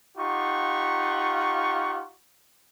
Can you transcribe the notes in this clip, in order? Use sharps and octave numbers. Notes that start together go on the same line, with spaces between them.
D#4 F4 G4 F#5 C#6